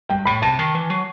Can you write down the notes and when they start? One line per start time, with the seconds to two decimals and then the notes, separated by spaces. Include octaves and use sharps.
0.10 G2 G5
0.25 A2 B5
0.42 C3 A5
0.59 D#3
0.75 E3
0.90 F#3